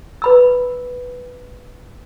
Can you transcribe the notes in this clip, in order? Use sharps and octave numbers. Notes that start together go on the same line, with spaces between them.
B4 B5 E6